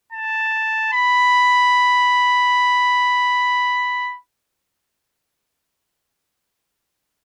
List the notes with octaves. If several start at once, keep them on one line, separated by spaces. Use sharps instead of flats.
A5
B5